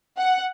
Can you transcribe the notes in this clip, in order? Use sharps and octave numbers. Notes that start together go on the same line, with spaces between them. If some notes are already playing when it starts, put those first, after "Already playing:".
F#5